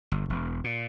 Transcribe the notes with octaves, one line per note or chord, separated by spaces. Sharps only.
G1
E1
A#2